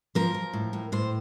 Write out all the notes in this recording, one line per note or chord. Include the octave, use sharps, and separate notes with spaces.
F3 A#4
F3
A2
A2
A2 C5